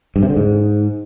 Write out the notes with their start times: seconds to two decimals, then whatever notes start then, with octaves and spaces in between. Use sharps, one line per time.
0.16 G2
0.23 C3
0.30 D3
0.36 G#2